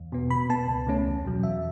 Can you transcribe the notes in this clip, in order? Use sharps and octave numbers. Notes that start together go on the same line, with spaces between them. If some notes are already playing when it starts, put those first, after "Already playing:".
Already playing: E2
B2 B3
B2 B5
B3 A5
C#2
C#3 A3 C#4
E2
B2 F#3
E2 E5